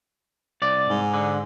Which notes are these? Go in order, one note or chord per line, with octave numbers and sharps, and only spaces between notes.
C2 D5
G#2
D3